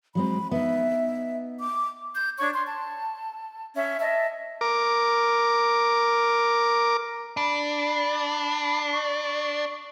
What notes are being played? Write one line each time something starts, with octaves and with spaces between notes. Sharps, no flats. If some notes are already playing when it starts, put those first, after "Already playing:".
F#3 G#3 C4 B5
B3 D#4 E5
D6
G6
D4 C#5 C#6
C6
A5
C#4 E5
D#5 E5 A5
A#4 D6
D4 B5
C#6